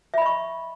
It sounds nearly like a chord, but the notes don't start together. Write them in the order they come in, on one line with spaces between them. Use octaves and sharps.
E5 B5 D#5 C#6